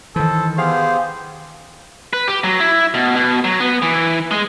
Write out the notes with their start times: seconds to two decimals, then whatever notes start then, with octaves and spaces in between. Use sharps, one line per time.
0.16 D#3 E3 A4 C5
0.58 B3 G4 G#4 C5 F5
2.13 B4
2.28 G4
2.44 F#3
2.60 E4
2.94 B2
3.16 B2
3.44 F#3
3.60 B3
3.82 E3
4.31 G#3